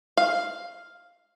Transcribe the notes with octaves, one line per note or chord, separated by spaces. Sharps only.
F5